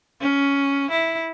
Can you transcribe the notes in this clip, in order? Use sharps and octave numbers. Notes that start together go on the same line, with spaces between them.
C#4
E4